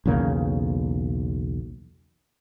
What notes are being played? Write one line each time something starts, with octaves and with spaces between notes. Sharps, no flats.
B1 E2 C#3 A#3